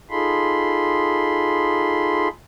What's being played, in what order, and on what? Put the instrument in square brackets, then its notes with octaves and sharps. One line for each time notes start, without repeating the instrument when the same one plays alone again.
[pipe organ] D#4 F4 G#4 A4 B5 C6